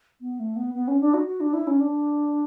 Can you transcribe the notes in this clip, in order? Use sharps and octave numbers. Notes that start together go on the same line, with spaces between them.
B3
A3
B3
B3
C#4
D4
F#4
F#4
D4
E4
C#4
D4